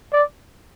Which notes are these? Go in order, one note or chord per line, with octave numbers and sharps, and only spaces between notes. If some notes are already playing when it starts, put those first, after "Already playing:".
D5